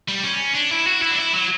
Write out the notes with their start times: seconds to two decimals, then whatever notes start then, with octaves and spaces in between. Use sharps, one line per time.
0.08 G3
0.23 C#4
0.55 D4
0.71 E4
0.87 F#4
1.02 E4
1.11 D4
1.18 E4
1.34 F#3